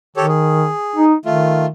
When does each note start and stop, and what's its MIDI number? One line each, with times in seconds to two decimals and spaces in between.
0.16 0.70 51
0.16 0.26 67
0.16 0.26 69
0.16 0.26 73
0.28 1.05 68
0.96 1.14 63
1.25 1.71 51
1.25 1.66 57
1.25 1.66 65